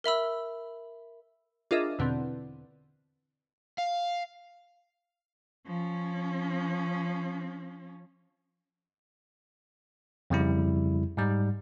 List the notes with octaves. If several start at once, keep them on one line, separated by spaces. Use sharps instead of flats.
A#4 E5 B5 E6
D4 F4 G#4 A#4 D#5 E5
E2 B2 D3 C4
F5
F3 C#4
F2 C#3 G3 E4
G#2 G3